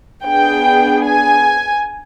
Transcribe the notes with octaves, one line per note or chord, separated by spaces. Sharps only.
B3 D4 G#4 G5
G#5